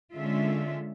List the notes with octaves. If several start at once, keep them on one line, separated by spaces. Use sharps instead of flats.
D3 G#3 C#4 F4 E5